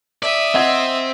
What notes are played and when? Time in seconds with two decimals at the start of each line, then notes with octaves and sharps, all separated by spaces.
0.23 D5 E5 D#6
0.55 C4 D#5 F#5 G#6